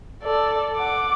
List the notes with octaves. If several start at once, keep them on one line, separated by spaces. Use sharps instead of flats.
A4 D5
F#5 D6